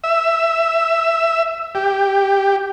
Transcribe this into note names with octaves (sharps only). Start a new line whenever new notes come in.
E5
G4